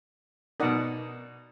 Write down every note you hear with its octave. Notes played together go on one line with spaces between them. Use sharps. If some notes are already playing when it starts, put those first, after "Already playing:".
B2 D#4 A#4 D5 F#5